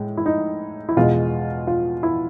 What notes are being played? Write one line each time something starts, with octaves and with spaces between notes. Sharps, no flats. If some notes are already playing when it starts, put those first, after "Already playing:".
Already playing: A2 G#3
E4
D#4
E4
E2 B2 G#3 F4
F4
E4